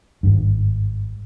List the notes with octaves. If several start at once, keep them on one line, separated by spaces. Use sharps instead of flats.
G#1 G2